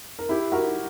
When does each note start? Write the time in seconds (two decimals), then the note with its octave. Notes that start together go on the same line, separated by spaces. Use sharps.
0.19 A#4
0.29 E4 G4
0.52 F#4 A#4